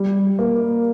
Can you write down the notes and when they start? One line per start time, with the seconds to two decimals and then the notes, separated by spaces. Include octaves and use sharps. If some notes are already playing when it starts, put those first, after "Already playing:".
Already playing: G3
0.39 A#3